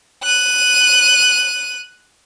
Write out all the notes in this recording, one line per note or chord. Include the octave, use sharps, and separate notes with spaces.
F#6 D#7